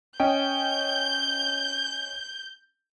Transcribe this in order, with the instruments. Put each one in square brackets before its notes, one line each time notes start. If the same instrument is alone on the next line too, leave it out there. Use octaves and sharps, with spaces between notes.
[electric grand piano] C#4 D#5 G5 [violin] G6